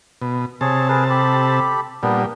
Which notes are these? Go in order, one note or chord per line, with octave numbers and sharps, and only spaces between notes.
B2
C3 G#4 C#5 A5
G#4 A#4 B4
G4 A4 B5
A#2 G3 B3 D4